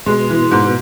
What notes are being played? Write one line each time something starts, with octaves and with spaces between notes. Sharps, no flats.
B2 G#3
E3
G#2